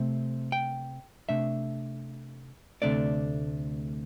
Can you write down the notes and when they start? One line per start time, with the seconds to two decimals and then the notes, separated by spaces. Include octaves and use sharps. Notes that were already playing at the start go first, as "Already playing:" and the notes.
Already playing: C3 A3 C4
0.52 G5
1.29 C3 A3 D4 E5
2.82 D2 C3 A3 D4 D5